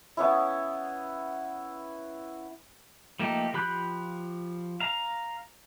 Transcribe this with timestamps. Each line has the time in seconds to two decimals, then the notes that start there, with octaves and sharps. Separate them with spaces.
0.17 B3 C#4 E4
3.19 F3 A3 A#3 D#4 G4
3.54 F3 G4 B5 F#6 G6
4.80 F5 A#5